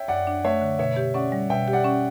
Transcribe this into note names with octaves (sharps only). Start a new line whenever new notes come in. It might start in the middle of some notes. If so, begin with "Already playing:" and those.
Already playing: C#5 E5 G5
F#2 D5 F#5
D4
A3 C#5 E5
D3
B2 C#5 E5
G4
C#4 D5 F#5
G3
B2 E5 G5
G4
D5 F#5
C#4